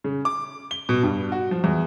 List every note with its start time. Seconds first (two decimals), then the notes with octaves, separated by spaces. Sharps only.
0.04 C#3
0.25 D6
0.71 G7
0.89 B2
1.03 G2
1.32 F#4
1.51 F3
1.64 E2